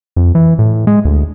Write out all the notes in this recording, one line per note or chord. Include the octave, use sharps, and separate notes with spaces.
F2
E3
A2
G#3
D2